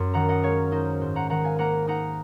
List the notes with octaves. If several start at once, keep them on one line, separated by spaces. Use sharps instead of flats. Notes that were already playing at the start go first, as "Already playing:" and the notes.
Already playing: F#2 C6
D#3 F#5 A#5
D#5 F#5
G#3 C#5 F5
D#4 C5 D#5
G#2 C5
F#5 A#5
D#3 F#5 A#5
F5 G#5
A#3 F#5 A#5
D#4 F#5 A#5